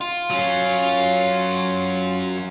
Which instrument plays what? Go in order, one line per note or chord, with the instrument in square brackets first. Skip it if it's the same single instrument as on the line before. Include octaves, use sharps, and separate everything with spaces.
[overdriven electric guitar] F4
[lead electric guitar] F#3 C#4